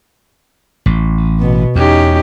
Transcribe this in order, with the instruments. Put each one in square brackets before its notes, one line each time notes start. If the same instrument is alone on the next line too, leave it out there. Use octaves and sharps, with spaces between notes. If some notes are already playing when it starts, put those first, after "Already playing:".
[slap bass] A1
[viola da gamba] B2 B3
[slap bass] E2 [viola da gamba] C#4 D#4 G4